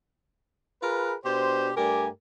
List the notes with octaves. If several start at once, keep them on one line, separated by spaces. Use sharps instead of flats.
F4 G#4 A#4 B4
B2 D4 G4 C5
G2 A3 G4 A#4 D5 G#5